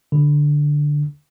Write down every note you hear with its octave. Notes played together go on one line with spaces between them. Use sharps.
D3